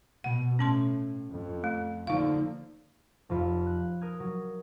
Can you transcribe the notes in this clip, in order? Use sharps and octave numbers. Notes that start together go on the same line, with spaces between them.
B2 F#5
A2 C#4 A5 C6
F2
A3
D3 F3 A#3 D#4 F5
F1 F2 F4 B5
F#6
A#4 D#6 F6 G#6
F#3